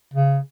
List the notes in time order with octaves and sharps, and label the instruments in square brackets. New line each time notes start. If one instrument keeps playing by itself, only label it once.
[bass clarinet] C#3